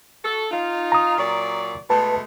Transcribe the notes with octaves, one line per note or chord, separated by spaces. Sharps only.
F#4 A4
D#4 F4
A#5 D#6
A#2 F#3 D5
B2 G#3 A3 B4 A5